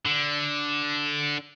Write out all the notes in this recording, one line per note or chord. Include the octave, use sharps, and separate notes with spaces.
D3